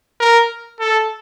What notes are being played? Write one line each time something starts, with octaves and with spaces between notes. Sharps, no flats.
A#4
A4